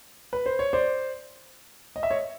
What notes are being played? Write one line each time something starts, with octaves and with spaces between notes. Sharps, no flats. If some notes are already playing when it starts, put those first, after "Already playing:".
B4
C5
C#5
C5 D5
D#5
E5
C#5 D#5